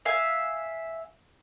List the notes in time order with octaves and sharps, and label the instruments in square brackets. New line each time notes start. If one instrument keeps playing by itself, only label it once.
[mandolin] E5 F5 G#5